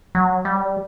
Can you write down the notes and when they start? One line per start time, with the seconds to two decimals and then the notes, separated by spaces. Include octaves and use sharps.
0.15 F#3
0.45 G3